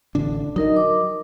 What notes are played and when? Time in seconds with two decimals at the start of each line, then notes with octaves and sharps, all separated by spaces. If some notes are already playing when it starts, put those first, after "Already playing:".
0.15 A1 D3 D4
0.56 F#3 D#4 A#4 D#5
0.76 D6